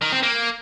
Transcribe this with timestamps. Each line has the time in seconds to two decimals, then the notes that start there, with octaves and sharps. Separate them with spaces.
0.02 D#3
0.12 C4
0.23 A#3